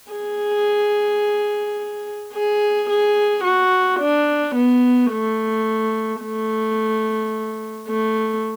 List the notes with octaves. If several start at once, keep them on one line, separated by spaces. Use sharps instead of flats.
G#4
G#4
G#4
F#4
D4
B3
A3
A3
A3